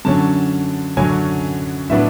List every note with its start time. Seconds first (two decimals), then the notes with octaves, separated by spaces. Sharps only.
0.05 F#2 D3 F#3 C#4 A5
0.97 F#2 D3 F#3 C#4 G#5
1.90 A2 F#3 B3 D4 E5